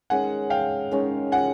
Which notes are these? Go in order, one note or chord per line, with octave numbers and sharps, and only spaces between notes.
D#3 G#3 C#4 F#5 G#5
F5 G5
D#3 G#3 C#4
F#5 G#5